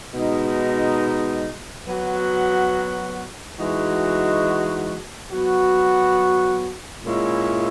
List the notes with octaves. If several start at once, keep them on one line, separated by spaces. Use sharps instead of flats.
B2 G#3 D#4
F#3 B3 F#4
E3 G#3 D#4 F#4
F#3 B3 F#4
A#2 G#3 C#4 E4